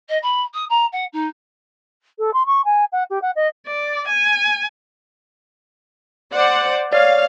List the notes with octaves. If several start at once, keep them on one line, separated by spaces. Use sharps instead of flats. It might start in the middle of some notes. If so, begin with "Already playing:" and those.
D#5
B5
D#6
A#5
F#5
D#4
A4
C6
C#6
G#5
F#5
G4
F#5
D#5
D5
G#5
C5 D5 F#5
C#5 D5 F5